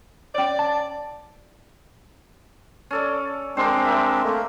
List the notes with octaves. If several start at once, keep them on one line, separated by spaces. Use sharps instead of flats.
C#4 C#5 D5
A5
C#4 A4 D5
G#3 C4 D4 A#4 C5
A#4 E5
A3 A#3